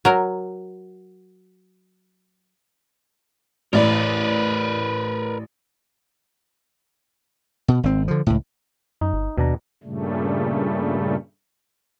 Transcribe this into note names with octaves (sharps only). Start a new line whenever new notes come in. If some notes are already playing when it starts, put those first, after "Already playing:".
F#3 A#4
A1 A#4 B4 D5
B2
G#1 C4
D3 F3
C#2 A2
F#2 D#4
G1
D#2 B2 D4 A#5
G2 A#2 C#3 G3 A3